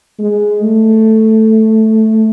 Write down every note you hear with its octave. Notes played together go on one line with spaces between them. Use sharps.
G#3
A3